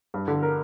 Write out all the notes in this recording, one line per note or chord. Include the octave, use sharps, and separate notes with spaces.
G2
D3
A#4